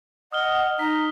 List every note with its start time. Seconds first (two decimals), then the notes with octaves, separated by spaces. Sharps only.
0.32 D#5 F#5 D#6 F6 G7
0.79 D#4 A#5 B6